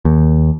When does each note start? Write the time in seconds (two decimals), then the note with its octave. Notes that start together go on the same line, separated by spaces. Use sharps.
0.05 D#2